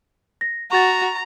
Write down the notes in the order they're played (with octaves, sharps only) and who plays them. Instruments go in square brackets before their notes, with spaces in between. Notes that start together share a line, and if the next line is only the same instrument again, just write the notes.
[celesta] A#6
[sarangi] F#4 [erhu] A#5 [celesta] C#6 A6